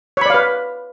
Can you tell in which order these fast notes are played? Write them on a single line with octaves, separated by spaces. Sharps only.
C#5 B5 D5 F5 B4